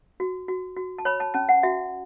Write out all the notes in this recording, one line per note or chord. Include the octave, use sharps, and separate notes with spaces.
F#4
F#4
F#4
A5
C#5 B5
A5
C#4 A5
F#5
F#4 E5